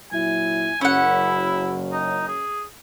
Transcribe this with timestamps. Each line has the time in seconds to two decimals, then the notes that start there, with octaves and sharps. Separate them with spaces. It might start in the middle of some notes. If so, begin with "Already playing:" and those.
0.12 A#2 F#3 E4 G#5
0.81 F#1 F#2 C#4 E4 F#5
1.92 D#4
2.27 G#4